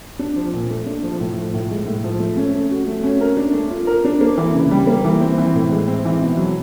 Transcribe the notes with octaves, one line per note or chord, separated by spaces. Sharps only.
D4
F3
A#2
A3
D4
F3
A2
F3
A2
G#3
A2
F3
A3
C#4
A3
F#4
A3
C#4
A#4
D4
A3
F4
A#4
D4
A#3
E3
C#3
G3
A#3
E3
C4
E3
A2
G#3
C4
E3
B2
F#3